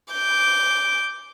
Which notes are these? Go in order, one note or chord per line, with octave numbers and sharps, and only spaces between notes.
D6 G6